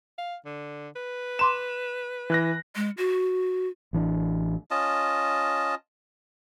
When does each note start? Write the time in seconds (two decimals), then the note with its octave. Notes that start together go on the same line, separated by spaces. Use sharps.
0.18 F5
0.46 D3
0.96 B4
1.39 A#5 C6 D6 E7
2.30 E3 F#6 A#6
2.76 G#3
2.98 F#4
3.93 A1 E3 A3 D4
4.71 C#4 F4 D#5 A5